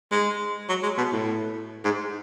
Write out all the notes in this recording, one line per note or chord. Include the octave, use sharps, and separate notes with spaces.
G#3
F#3
G#3
B2
A2
G#2